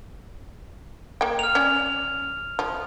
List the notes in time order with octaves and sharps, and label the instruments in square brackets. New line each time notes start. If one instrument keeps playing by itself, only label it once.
[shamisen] A#3 G5
[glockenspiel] F6 F7
[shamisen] C#4 D5
F3